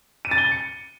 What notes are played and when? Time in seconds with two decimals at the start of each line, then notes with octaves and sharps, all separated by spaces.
0.25 D#7
0.31 A6
0.38 G7
0.45 A6
0.51 C#7